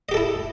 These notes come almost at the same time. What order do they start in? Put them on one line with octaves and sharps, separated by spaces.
D#5 G4 A4 E4